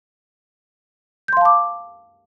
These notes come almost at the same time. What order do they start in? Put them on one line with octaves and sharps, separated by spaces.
G6 C6 F5 A5 D6